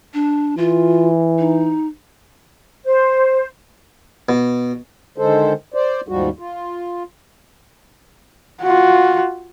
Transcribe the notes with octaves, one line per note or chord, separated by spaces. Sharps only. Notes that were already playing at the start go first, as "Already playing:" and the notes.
D4
E3 F4
D#4
C5
B2
D3 D#3 G#3 A4 C5
C5 D5
D#2 G#2 F3 G3 F#4
F4
F4 F#4